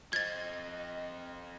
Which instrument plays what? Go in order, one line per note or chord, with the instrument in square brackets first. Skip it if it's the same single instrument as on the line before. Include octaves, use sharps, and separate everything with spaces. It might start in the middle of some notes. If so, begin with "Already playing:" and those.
[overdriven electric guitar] F3 C4 [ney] D#5 [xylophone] G#6 A6